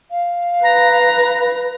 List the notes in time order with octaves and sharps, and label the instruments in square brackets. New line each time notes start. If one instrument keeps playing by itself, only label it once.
[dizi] F5
[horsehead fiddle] B4 [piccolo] A#5